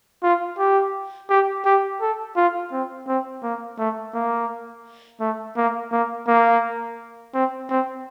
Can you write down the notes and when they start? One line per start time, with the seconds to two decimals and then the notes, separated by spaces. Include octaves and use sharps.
0.23 F4
0.59 G4
1.30 G4
1.65 G4
2.01 A4
2.37 F4
2.72 C4
3.08 C4
3.43 A#3
3.79 A3
4.14 A#3
5.21 A3
5.57 A#3
5.92 A#3
6.28 A#3
7.34 C4
7.70 C4